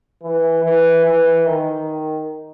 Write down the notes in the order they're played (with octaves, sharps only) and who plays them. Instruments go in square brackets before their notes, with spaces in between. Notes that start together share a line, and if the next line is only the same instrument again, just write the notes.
[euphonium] E3
E3
E3
D#3